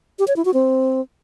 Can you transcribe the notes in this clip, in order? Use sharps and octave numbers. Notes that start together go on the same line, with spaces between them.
G4
C#5
E4
F#4
C4